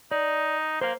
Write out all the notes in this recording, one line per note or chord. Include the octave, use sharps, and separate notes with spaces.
D#4 D5
A#3 C5 F5